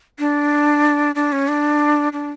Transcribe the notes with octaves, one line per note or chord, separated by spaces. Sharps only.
D4
D4
C#4
D4
D4